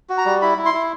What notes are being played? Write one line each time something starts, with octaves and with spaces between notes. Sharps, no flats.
F#4
A#5
G3
E4 B5
E4
C6
E4